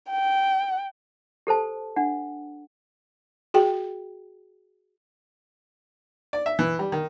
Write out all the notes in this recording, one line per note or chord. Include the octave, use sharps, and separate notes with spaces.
G5
G4 A4 C5 A5
D4 F#5
F#4 G#4 G5
D5
E5
E3
G3
D#3